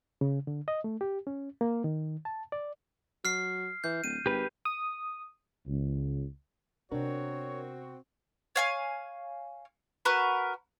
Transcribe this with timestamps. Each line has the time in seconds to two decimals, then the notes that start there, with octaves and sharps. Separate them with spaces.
0.21 C#3
0.47 D3
0.68 D#5
0.84 A3
1.01 G4
1.27 C#4
1.61 A#3
1.84 D#3
2.25 A5
2.52 D5
3.25 F#3 F6 C7
3.84 E3 G6
4.04 D1 D#7
4.26 G#1 G4 B4
4.65 D#6
5.67 C#2
6.92 C3 B3 C4 D4 F#4 A#4 C#5
8.56 C#5 F5 G#5
10.05 F#4 A#4 B4